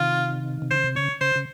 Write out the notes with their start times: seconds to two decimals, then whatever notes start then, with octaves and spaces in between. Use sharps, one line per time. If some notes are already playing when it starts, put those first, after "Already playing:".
Already playing: C3 D#3 F4
0.62 C3
0.71 C#3 C5
0.84 C3
0.95 C#3 C#5
1.21 C#3 C5
1.36 C#3